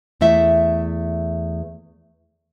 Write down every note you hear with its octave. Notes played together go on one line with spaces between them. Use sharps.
E2 A3 E4 E5